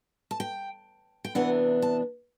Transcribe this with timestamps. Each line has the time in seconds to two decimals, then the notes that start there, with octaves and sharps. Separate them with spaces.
0.31 A5
0.40 G5
1.25 G5
1.35 E2 C3 E3 B3 D4 F#5
1.82 A5